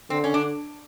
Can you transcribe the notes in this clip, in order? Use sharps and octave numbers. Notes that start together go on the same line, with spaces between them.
D3 C4
C#4
D4